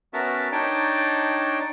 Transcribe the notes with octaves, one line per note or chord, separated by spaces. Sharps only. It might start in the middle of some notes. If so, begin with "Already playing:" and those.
B3 C#4 F#4 A#4 E5 A5
D4 D#4 C#5 G5 A5